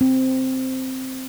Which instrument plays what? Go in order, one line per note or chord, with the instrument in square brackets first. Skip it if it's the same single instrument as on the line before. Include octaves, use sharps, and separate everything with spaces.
[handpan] C4